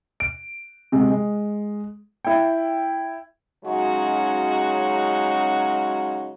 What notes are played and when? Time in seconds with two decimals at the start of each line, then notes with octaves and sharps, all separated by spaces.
0.20 D7
0.92 C3 G#3
1.11 G#3
2.25 E4 G5
3.65 C#3 F#3 G#3 C#4 D#4 F#4